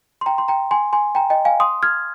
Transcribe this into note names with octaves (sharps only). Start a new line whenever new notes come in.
C6
G5 A#5
C6
G5 A#5
G#5 C6
G#5 C6
G5 A#5
D#5 G5
F5 G#5
C6 D#6
F6 G#6